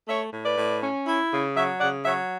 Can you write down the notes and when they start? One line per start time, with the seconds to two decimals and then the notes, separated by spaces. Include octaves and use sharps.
0.08 A3 C#5 E5
0.33 A2
0.45 B4 D5
0.57 A2
0.81 C#4
1.06 E4
1.31 C#3
1.56 F#3 C#5 E5
1.80 C#3 D5 F#5
2.04 F#3 C#5 E5